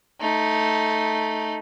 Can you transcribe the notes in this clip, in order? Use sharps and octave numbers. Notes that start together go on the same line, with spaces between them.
A3 D#4